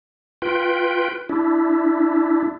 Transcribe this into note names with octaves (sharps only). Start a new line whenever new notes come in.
F4 B4 G5
D4 E4